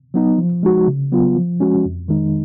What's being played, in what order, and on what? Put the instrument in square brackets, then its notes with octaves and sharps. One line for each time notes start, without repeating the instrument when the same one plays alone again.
[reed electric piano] F#3 B3 D#4
F3
G#3 D#4 F#4
C#3
F#3 B3 F4
F3
G#3 C#4 F#4
F2
D#3 G#3 D#4